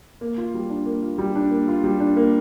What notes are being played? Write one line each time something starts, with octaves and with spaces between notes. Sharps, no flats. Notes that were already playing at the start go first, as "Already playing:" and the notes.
A#3
F4
G3
D4
A#3
F4
G3
D4
A#3
F4
G3
D4
A#3